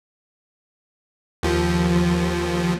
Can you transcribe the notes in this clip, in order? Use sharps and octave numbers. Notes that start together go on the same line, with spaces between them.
D#2 F3